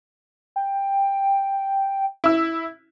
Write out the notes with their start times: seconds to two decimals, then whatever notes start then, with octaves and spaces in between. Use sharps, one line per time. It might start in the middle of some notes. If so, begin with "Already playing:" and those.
0.56 G5
2.24 E4 E6